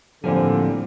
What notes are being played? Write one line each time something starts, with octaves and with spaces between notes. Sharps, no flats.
A2 D3 F3 G3 A#3 C4 G#5